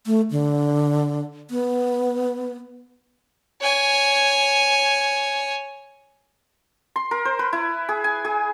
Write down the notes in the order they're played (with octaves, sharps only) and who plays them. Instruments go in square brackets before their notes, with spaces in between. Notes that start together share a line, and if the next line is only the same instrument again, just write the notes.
[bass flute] A3
D3
B3
[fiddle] C#5 G#5
[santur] C6
A#4
C5
B4
E4
G#4
G#5
G#4